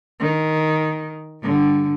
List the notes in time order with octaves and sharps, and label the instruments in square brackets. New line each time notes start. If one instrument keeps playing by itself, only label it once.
[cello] D#3
G2 D3